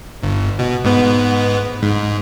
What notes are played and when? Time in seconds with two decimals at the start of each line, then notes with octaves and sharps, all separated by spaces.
0.23 G1
0.59 B2
0.85 G#2 B3
1.83 G#2